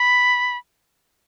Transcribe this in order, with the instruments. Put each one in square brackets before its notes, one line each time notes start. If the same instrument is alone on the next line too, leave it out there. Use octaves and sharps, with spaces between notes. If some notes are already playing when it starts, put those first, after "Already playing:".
Already playing: [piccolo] B5